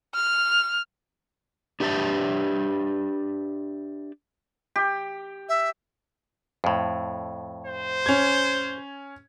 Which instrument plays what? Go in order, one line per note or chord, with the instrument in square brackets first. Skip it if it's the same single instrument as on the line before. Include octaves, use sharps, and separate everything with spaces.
[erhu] F6
[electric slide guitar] D4 G4 B4 E5 A5
[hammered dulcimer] G4
[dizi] E5
[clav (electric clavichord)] F2 A2
[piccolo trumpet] C5
[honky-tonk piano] C#4 G#6